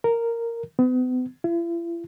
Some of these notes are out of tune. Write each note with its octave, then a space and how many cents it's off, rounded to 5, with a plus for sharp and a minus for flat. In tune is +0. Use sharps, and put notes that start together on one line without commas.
A#4 -10
B3 +40
E4 +45